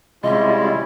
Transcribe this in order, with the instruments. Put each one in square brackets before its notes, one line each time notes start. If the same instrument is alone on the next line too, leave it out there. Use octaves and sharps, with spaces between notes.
[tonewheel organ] C3 G#3 F4 [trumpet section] G3 C#4 E4 [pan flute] D#5